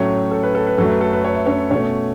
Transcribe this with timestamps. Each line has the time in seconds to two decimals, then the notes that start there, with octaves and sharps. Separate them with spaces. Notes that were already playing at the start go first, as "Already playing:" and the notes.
Already playing: A2 F#3 A3 C#4 C#5
0.31 A4
0.43 B4
0.55 A4
0.67 B4
0.78 F#2 F#3 A3 A4
0.89 B4
1.01 A4
1.13 B4
1.24 C#5
1.35 E5
1.47 C#4 C#5
1.71 B2 A3 C#4 C#5